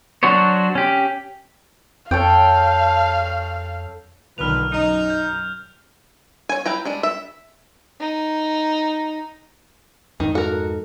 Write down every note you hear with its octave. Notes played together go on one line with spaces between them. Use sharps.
F#3 D4 F#4 C5 C#5
C#4 G4
F2 A4 C#5 F5 G5
B1 A#2 D3 D#3 F3 B4 F6 F7
F#2 D#4
G6
C#5 G#5
E4 B4 G5 A#5
G3 G#3 D4
E5
D#4
F2 G#2 D#3
F#4 A4 A#4